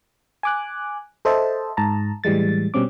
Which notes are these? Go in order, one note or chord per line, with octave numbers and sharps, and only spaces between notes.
G#5 D6 F#6
A4 C5 D#5 E5 A5
G#2 A5 A#5
A2 E3 G3 G#3 A6
B2 G3 C4 C#4 D6